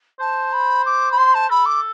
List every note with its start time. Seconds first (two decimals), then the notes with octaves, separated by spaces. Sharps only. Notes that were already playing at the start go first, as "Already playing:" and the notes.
0.20 C5 A5
0.53 B5
0.86 D6
1.12 B5
1.17 C5 C6
1.34 A5
1.50 A4 B5
1.65 D6